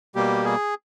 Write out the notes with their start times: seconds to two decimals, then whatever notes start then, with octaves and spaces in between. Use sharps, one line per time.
0.15 B2 G3 A#3 G4
0.45 G#4